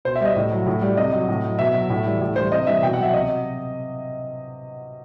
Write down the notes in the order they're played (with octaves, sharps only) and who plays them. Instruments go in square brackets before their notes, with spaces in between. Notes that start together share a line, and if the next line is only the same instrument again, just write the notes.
[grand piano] B2 C5
E5
G3 D#5
A2
F#3
A2
G3
C3 D#5
F#3
A2
F#3
B2 E5
F#3
A2
E3 G3
A2
E3 G3 C5
C3 D#5
E3 G3 E5
B2 G5
F#5
F#3
E5
C3 D#5